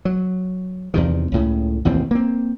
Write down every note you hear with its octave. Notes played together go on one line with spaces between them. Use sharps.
F#3
E2 C3 D#3
C#2 A2 C#3
A1 D#2 B2 C4
A#3 C4